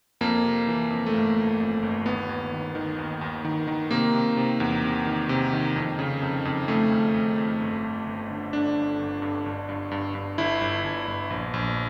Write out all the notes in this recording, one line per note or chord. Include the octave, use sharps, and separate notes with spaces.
F2 A#3
C3
E3
F2
A3
G1 A#3
G1
F2
G1
D#2 B3
D#2
D#3
D#3
D#2
D#2
D#3
D#3
C3 A#3
C3
C3
E2
C3
D#3
C3
D#3
F2
C#3
F2
F2
F2 A3
F2
F2
F2
G1
G1
G1
D3
G1 D4
G2
G1
G2
G1
G2
G2
G2
G1 E4
G1
G1
G1
A#1
A#1